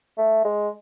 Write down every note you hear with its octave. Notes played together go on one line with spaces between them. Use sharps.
A3
G#3